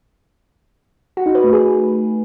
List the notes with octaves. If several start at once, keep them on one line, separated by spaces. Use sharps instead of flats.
F#4
D#4
B4
A3
G#4